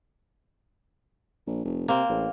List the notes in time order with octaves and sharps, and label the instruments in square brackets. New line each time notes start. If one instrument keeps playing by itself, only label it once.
[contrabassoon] A#1
F1
[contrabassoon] C3 [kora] A#3 C4
[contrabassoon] A1